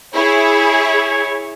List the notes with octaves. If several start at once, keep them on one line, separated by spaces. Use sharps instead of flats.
E4 G#4 C#5